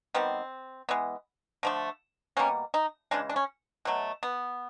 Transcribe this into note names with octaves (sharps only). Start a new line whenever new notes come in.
D#3 G3 B3 C4
E3 G#3 B3
D3 F3 A3
B2 G3 A#3 C#4
D#4
C#3 E3 G#3 D4
D4
C#4
B2 F#3 A3
B3